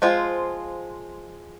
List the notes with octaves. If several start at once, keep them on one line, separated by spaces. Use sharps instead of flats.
F3 G#3 C4 F4